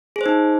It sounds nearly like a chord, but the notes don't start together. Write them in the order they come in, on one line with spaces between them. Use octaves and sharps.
G#4 C5 D#4